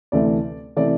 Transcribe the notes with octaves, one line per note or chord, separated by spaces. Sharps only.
D2 C3 E3 A3 D5
C3 E3 A3 D5